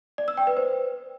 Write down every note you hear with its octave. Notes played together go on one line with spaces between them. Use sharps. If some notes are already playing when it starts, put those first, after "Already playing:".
D5
E6
G5
B4
C5